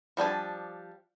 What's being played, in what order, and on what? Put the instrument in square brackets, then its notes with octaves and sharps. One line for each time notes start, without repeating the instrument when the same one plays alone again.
[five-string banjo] F3 G3 D4 G#5